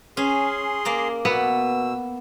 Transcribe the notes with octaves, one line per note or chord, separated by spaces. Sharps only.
C#4 G#4 C6
A#3 D5 A#5
B2 B3 E6